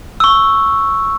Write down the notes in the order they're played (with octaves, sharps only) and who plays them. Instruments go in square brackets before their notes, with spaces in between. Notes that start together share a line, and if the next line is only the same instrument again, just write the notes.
[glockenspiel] C#6 E6